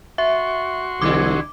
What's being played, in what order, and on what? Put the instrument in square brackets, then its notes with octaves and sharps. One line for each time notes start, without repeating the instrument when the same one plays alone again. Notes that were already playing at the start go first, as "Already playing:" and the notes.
[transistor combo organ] F#4 C6 C#6 [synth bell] E5
[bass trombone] C2 [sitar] D3 G3 E4 [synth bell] D6